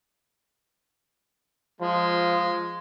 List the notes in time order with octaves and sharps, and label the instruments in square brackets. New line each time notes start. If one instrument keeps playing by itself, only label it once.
[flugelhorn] F3 [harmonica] G#3